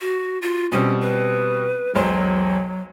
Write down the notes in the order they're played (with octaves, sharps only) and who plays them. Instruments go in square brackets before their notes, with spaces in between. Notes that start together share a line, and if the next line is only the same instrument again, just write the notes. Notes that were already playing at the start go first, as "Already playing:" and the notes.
[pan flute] F#4
F4
[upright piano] B2 G3 C4 [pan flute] C#4
[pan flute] B4
[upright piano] E1 B1 C5 [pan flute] F#3